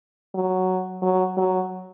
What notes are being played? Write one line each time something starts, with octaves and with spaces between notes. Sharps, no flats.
F#3
F#3
F#3